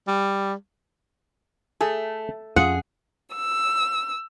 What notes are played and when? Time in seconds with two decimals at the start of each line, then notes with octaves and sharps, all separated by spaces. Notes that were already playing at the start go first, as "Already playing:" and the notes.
0.07 G3
1.81 A3 G#4 A4 G#5
2.56 F2 C#4 F4 G#4 F#5
3.36 E6